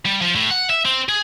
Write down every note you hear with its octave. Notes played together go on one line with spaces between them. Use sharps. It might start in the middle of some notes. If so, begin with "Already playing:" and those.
G3
F3
A2
F#5
E5
C4
G#4